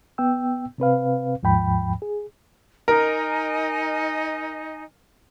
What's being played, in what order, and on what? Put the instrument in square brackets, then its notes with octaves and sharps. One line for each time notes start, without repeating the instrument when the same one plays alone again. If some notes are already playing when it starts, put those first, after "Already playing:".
[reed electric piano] B3 G5 E6
C3 C4 B4 F5
D#2 G#2 F3 G5 B5
G#4
[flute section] D#4 D#5 G#5 [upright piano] A#4